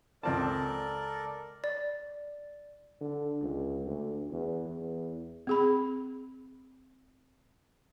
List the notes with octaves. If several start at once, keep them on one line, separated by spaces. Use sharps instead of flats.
C#2 C4 A4 A#4 D5 A5
D5
D3
C#2
D2
E2
E2
C4 G#4 B5